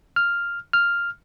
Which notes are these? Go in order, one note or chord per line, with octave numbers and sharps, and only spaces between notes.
F6
F6